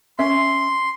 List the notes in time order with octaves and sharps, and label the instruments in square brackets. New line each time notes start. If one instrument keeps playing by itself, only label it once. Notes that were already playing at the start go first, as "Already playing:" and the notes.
[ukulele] C#4 E5 [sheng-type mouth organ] C6